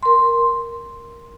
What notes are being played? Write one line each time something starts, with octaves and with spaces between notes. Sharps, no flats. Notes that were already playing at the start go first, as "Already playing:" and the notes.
A#4 C6